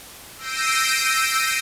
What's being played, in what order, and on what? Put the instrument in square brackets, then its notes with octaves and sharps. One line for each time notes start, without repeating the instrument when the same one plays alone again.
[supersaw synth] E6 G6 A#6 C7 D7 D#7